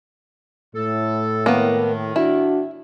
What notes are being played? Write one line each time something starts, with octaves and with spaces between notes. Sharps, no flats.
A2 A4
D#3 A#3 B3
D4 E4 F#4